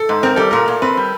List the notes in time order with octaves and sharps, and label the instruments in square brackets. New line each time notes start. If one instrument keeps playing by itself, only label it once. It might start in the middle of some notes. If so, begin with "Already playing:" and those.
Already playing: [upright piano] A4
[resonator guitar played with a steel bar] G#2
[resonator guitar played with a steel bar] C4 [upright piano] A#4
[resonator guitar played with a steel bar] G3 [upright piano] A4
[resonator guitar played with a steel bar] A#2 [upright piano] A#4
[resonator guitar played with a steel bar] A#2
[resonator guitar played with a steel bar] C4 [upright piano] B4
[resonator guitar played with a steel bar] G3